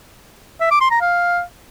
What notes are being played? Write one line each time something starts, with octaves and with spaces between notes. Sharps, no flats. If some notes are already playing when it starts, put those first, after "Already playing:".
E5
D6
C6
A#5
F5